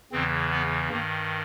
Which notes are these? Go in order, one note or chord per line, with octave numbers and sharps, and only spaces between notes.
E2 C#3 E3 C4
B3
G2 D#3 A#3